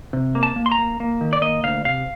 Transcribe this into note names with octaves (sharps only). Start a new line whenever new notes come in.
C3
A#3
A5
A#3
C6
A#5
A#3
A#3
D#3
D5
A#3 D#5
D2 F5
C3 F5